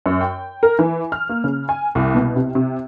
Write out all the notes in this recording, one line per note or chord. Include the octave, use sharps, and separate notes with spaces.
F#2
G5
A#4
E3
F6
A#3
C#3
G#5
C2
B2
C3
C3